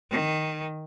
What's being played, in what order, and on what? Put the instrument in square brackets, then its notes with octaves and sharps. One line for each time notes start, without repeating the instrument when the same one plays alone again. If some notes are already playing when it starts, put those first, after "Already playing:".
[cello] D#3